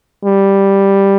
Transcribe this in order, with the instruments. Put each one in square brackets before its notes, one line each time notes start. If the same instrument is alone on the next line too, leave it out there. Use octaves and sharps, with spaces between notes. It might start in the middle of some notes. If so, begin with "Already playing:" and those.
[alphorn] G3